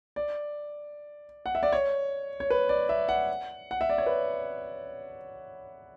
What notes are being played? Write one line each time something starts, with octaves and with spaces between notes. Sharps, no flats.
D5
F#5
E5
D5
C#5
C#5
B4
D5
E5
F#5
F#5
E5
D5
C#5
B4